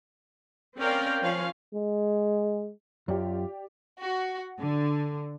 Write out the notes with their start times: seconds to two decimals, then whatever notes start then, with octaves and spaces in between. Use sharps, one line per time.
0.78 C4 C#4 A#4 D5 F5 G5
1.21 F3 C#4 F5
1.74 G#3
3.08 F#2 F4 G4 D5
4.01 F#4
4.59 D3